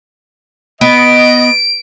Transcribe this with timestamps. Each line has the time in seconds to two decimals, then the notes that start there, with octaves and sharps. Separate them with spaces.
0.81 B3 D#5 D7